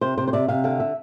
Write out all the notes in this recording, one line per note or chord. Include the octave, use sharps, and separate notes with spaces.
C3 C5
C3 C5
C5
C3 D5
C3 F5
D3 F5
E5